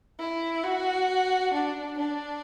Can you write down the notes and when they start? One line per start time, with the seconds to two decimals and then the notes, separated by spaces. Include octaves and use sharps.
0.19 E4
0.64 F#4
1.53 D4
1.98 D4